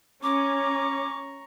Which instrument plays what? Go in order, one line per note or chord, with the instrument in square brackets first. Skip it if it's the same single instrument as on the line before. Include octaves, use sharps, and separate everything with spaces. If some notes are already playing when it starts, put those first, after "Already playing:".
[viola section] C#4 [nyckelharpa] A#5 C#6 [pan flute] D6